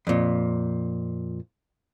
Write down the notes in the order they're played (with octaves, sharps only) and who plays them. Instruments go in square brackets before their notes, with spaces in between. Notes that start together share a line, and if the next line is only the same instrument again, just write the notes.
[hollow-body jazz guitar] F2 A#2